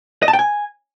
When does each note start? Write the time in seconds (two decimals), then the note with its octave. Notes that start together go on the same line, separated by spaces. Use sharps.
0.22 D#5
0.28 A5
0.33 G5
0.39 G#5